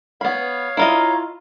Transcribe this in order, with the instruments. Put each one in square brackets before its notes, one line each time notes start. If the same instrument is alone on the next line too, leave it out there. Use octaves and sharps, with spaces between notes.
[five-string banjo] B3 B5 [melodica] C#5 F5
[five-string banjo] E4 F4 D#5 [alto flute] A#5